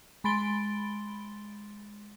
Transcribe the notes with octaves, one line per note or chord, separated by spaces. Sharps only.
G#3 B5 C6 A6 D7 G7